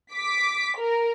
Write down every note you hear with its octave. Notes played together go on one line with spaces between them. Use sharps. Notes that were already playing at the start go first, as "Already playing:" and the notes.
D6 B6
A#4